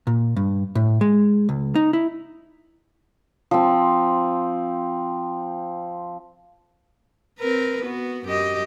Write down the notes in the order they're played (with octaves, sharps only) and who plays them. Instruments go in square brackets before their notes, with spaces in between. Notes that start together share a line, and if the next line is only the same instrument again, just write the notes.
[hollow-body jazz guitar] A#2
G2
A2
G#3
C#2
D#4
E4
[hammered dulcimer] F3 C4
[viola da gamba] C4 A#4 B4
B3 F#4
F#2 G4 D#5